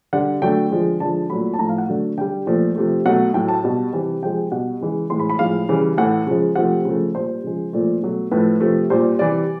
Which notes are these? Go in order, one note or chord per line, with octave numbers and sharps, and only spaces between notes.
D3 G3 F#5
D3 F#3 A3 G5
D3 F3 G#3
D3 F3 G#3 A5
A#2 F#3 A3 B5
A5
A2 F3 A3 A#5
F5
F#5
D3 F#3 A3
D3 G3 G5
A#2 F3 A3
C3 F3 A3
B2 F#3 A3 F#5
A2 F#3 A3 G5
A5
B2 G3
C3 E3 G3
C3 F3 G#3 G5
B2 G3 F#5
C#3 E3 G#3
A2 E3 G#3 C6
B5
B5
A2 F3 G#3 F5
C#3 E3 G3
A2 E3 A3 F#5
C#3 F3 G#3
C3 F3 A3 F#5
C#3 F3 A3
A#2 G3 C5
C#3 F3 G#3
A#2 F3 A3
B2 F#3 A3
A2 F3 A3 B4
C3 F3 A3
A#2 G3 C5
C3 E3 G3 D5